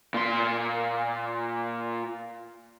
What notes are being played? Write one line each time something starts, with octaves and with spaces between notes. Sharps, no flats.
A#2 C6